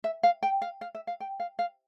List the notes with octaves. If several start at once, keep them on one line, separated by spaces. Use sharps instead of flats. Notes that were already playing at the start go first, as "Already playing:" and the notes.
E5
F5
G5
F5
F5
E5
F5
G5
F5
F5